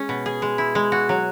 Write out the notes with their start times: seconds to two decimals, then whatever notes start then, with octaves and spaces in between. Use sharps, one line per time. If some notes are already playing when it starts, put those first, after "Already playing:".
Already playing: G#3 C#4
0.09 B2
0.26 G#4
0.42 G#3
0.58 E4
0.75 G#3
0.92 F#4
1.09 F#3